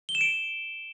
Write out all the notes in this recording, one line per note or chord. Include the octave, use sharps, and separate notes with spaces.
G7
E7
D7